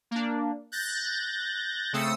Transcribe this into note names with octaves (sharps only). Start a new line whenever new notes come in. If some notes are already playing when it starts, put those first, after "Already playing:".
A#3 D4
F#6 G6 A6 A#6
C#3 A3 C4 D#6 E6 C#7